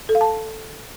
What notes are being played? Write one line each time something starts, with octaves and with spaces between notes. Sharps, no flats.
A4
F5
A5